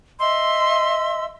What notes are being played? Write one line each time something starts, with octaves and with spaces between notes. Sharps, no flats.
D#5 E5 C6 E6